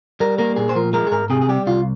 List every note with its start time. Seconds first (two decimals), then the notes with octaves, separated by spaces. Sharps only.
0.20 G3 A#4
0.39 A#3 A#4
0.56 A#2 G#4
0.69 C5
0.75 F3 A#4
0.93 G#3 A#4
1.07 G#4
1.11 G#2 A#4
1.30 C3 G#4
1.41 G#4
1.49 G3 G4
1.67 C2 F4